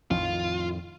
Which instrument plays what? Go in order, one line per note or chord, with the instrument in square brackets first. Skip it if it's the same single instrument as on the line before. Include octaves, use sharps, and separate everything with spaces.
[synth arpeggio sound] A#1 [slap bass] F2 A2 D#3 [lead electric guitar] F4